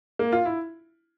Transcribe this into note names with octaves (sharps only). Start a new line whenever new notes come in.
A#3
F4
E4